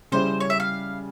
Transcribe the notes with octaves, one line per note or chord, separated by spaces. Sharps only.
C#3 G3 C#4 E4 C5
C#5
E5
F5